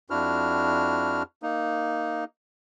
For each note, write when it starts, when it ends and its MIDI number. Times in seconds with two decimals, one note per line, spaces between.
0.10 1.23 41
0.10 1.23 62
0.10 1.23 64
0.10 1.23 66
0.10 1.23 89
1.43 2.24 58
1.43 2.24 63